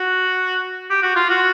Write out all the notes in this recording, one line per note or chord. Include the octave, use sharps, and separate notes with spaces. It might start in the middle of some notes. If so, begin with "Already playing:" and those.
Already playing: F#4
G4
F#4
F4
F#4